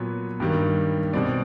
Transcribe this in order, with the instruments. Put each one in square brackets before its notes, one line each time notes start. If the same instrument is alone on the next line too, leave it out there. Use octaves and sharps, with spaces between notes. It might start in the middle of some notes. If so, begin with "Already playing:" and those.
Already playing: [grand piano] A#2 F#3 B3 C#5
G2 D#3 G3 A#3
B2 G3 C4 D5